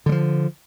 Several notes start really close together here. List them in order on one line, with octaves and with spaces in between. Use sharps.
D3 G3 F3